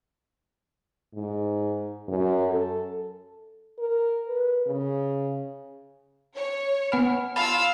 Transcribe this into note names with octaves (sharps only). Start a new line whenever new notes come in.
G#2
F#2
A4
A#4
B4
C#3
C#5
B3 F#5 G#5 B5 F6
F4 F5 A5 B5 E6